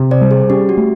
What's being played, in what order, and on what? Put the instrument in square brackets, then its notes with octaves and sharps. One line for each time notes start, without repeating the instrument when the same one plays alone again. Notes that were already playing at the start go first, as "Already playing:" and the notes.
Already playing: [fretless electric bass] C3
[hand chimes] C5 D5
[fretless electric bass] G3
[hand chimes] G#4
[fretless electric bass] C#4 [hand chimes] G4
[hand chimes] F#4
[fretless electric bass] A3